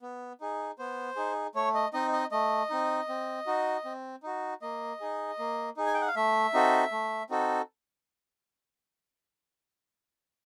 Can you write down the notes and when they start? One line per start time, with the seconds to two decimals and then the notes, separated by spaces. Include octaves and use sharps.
0.02 B3
0.41 D#4 G#4
0.79 B3 C5
1.16 D#4 G#4
1.55 A3 C#5
1.74 D#5
1.93 C4 D#4 D#5
2.13 D#5
2.32 A3 D#5
2.70 C4 D#4
3.09 C4
3.46 D#4 F#4
3.85 C4
4.23 D#4 F#4
4.62 A#3 D#5
5.00 D#4 G#4
5.39 A#3
5.77 D#4 G#4
5.87 G#5
5.94 G5
6.01 F#5
6.08 F5
6.16 A3 E5
6.54 C4 D#4 F#4 A4
6.91 A3
7.30 C4 D#4 F#4 A4